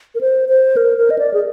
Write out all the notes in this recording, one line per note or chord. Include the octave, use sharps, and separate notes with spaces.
A#4
C5
C5
A#4
A#4
D#5
D5
G#4